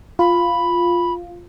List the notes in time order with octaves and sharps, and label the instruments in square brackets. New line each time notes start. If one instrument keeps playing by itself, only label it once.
[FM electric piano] F4 [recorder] B5